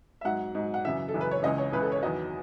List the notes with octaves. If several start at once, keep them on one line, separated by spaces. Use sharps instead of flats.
E5
G#2 F#3 F#5
G#2 F#3
F#5
F#2 C#3 E3 E5
A4
F#2 C#3 E3
B4
C#5
C#2 C#3 E3 D#5
C#5
C#2 C#3 E3 B4
A4
C#5
E2 D#3 F#3 D#5